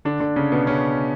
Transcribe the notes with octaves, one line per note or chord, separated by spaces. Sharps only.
D3 D4
D3 D4
C#3 C#4
B2 B3
C#3 C#4